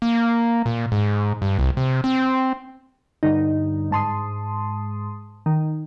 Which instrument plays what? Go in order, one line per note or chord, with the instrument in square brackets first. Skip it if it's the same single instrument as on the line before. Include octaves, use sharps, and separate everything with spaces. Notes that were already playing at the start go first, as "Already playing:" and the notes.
[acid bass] A#3
A#2
G#2
G2
C2
C3
C4
[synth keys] G2 D3 D#4
G#2 A5 C6 D#6
D#3